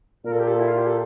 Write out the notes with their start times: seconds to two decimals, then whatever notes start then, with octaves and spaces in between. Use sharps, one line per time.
0.24 A#2 A#4
0.32 A4
0.39 G4
0.48 A4
0.59 E4
0.68 F4
0.78 G4
0.87 A4